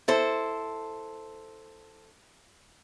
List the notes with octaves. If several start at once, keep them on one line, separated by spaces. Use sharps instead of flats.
E4 A4 C5